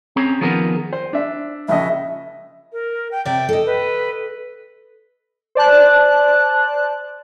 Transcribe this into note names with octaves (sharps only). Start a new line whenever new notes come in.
C4 C#4 G#4 C#5 A#5
D#3 F3 B3 G#4 A#4
C5
D4 E5
A#1 C#3 D#5 E5
A#4
G5
C3 D5 E5 G5
A4 D#5
B4
C5 D5 A5 F#6